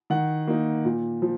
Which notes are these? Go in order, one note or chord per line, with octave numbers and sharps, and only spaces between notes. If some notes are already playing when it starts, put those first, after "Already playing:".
D#3 F#5
A#3 D#4
A#2
F3